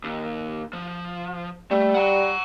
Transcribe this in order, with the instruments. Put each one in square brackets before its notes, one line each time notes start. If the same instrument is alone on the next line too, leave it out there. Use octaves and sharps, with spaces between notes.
[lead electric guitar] D#2
F3
[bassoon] G3 [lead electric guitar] A3
[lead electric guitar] F#5 A#5